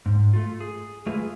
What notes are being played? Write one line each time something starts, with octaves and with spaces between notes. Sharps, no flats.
G#2
A3 F4
G#4
G#3 A3 F4 G#4 B4 E5